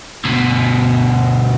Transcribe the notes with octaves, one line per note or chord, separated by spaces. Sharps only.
D2 B2